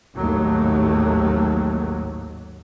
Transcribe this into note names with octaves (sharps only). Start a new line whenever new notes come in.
A1 D#2 G#2 F#3 A3 A#3